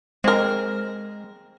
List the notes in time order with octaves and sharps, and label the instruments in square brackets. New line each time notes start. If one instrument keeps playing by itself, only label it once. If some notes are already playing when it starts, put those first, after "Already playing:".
[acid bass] G#3 [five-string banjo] C4 A#4